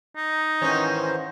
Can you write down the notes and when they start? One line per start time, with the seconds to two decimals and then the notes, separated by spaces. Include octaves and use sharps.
0.16 D#4
0.62 G#2 D#3 E3 C#4 C5 C#5